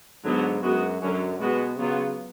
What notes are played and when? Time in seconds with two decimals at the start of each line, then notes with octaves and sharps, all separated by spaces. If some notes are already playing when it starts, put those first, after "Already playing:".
0.24 G#2 D3 F#3 B3
0.62 F#2 G#3 B3 F#4
1.01 F#2 D3 F#3 C#4
1.39 B2 G#3 B3 F#4
1.78 C#3 F#3 B3 F4